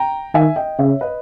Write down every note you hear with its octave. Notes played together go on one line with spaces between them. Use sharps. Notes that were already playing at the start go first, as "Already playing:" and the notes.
Already playing: G5 A#5
D#3 E5 G#5
D#5 G5
C#3 C#5 E5
B4 D#5